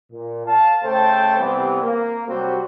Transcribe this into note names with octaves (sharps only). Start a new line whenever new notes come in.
A#2
F5 A5
C#3 A3 A4 C5 G5 A5
C3 E3 G3 B3 C4
A#3
C3 F#3 G3 C4 F#4